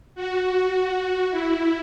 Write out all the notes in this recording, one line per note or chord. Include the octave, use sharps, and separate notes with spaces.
F#4
E4